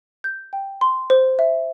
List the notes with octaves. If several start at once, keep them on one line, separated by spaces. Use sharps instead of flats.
G6
G5
C6
C5
E5